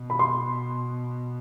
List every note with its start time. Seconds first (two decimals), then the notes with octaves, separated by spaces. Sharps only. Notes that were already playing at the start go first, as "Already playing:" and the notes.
Already playing: B2
0.10 B5
0.19 C6